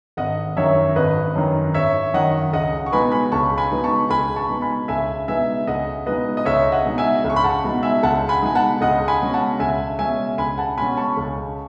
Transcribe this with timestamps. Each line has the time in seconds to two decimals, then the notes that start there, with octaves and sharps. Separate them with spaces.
0.17 G#1 D#5 F#5
0.57 F#2 D#3 C#5 E5
0.96 G#1 B4 D#5
1.36 F#2 D#3
1.74 G#1 C#5 E5
2.14 F#2 D#3 D#5 F#5
2.53 C#2 D#5 F#5
2.86 C#6
2.92 B2 G#3 B3 D#4 G#5 B5
3.12 G#5 B5
3.32 C#2 A5 C#6
3.58 G#5 B5
3.71 B2 G#3 B3 D#4
3.84 A5 C#6
4.10 C#2 G#5 B5
4.36 A5 C#6
4.49 B2 G#3 B3 D#4
4.62 G#5 B5
4.88 C#2 E5 G#5
5.28 B2 G#3 B3 D#4 E5 G#5
5.67 C#2 D#5 F#5
6.06 B2 G#3 D#4 B4 D#5
6.37 D#5
6.45 C#2 C#5 E5
6.72 D#5 F#5
6.85 B2 G#3 D#4
6.98 E5 G#5
7.24 C#2
7.30 C#6
7.36 B5
7.44 F#5 A5
7.64 B2 G#3 D#4
7.83 E5 G#5
8.03 C#2 F#5 A5
8.29 G#5 B5
8.42 B2 G#3 D#4 G#5
8.55 F#5 A5
8.81 C#2 D#5 F#5
9.08 G#5 B5
9.21 B2 G#3 C#4
9.34 F#5 A5
9.59 C#2 E5 G#5
9.99 B2 G#3 C#4 E5 G#5
10.38 C#2 G#5 B5
10.58 F#5 A5
10.77 B2 G#3 C#4 G#5 B5
10.97 A5 C#6
11.17 C#2